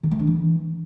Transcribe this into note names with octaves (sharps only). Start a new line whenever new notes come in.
D#3
A3
D4
E3